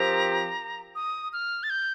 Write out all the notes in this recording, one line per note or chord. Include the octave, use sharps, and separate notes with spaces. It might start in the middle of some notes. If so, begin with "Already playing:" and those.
Already playing: F3 C4 G4 A#4 A#5
D#6
F6
A6
G6